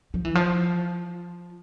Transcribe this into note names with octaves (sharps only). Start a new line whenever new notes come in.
F3
E3
F3